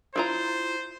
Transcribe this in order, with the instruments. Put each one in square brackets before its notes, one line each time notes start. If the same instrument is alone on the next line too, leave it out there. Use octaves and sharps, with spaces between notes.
[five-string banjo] E4 F4 A#5 [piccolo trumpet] C5